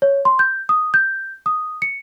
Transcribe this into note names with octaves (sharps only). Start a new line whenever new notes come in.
C#5
C6
G6
D#6
G6
D#6
C#7